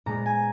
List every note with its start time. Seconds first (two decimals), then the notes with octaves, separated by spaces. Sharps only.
0.06 A#2 G#3 B3 A#5
0.26 G#5